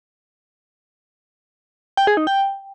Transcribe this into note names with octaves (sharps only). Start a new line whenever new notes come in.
G5
G#4
D#4
G5